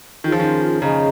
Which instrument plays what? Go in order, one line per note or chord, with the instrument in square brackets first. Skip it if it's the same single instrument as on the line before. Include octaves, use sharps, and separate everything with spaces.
[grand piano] D#3 [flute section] C#4 F4 G#4
[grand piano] F3
D#3
[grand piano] C#3 [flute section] C#4 G#4 D#5 A#5